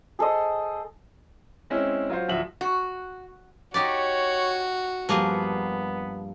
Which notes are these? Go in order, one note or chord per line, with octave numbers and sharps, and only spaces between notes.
G#4 A4 C5 D#5
G#3 C4 C#4 E4
F#3 F4 C5
D1 F3 F#4 E5 F#7
F#4
D#4 F#4 G4 C#5 D5
G2 F3 G3 A#3 B3 G#4